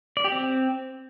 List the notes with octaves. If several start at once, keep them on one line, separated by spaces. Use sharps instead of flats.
D5
G4
C4